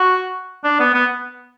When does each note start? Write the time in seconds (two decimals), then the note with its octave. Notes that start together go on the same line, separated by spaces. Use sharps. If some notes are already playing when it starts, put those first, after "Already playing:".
Already playing: F#4
0.64 D4
0.80 B3
0.94 B3